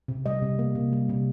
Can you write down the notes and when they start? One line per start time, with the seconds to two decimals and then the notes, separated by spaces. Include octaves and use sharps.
0.08 C3
0.26 G3 D#5
0.42 C3
0.59 A#3
0.75 C3
0.93 G3
1.09 C3